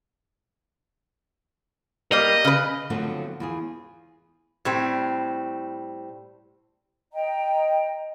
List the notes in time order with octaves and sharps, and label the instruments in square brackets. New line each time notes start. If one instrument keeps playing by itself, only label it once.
[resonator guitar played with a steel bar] G3 A#3 [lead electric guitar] D#5
[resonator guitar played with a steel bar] C#3 B4
[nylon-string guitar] D3 F3 F#3 A3 B3 C4
E2 F4 G#4
[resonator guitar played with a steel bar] A2 G3 C4
[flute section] D#5 G5 A#5